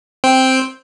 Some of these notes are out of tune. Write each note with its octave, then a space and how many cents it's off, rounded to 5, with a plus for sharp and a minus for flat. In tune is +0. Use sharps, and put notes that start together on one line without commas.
C4 +0 G5 +0